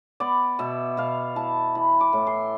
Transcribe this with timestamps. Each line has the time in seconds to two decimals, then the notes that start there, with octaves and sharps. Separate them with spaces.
0.20 B3 D5
0.59 B2 E5
0.97 B2 F5
1.36 E4 A5
1.75 E3 B5
2.00 D6
2.13 A2
2.27 C6